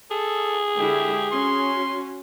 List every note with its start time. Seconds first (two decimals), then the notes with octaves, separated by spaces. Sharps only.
0.11 G#4 A4
0.79 D3 G#3 E4 G4
1.31 C#4 F#4 C6